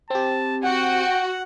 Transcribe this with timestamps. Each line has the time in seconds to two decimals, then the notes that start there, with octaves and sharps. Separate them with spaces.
0.10 C4 G4 A5
0.64 F#4 F#5 G5